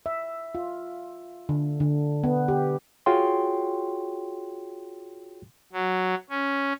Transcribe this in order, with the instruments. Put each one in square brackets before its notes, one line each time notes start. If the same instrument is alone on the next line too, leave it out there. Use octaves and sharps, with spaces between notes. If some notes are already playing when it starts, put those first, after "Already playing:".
[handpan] E5
F4
D3
D3
B3
G4
[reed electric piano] F4 F#4 G#4 C#5 G5 C6
[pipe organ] F#3
C#4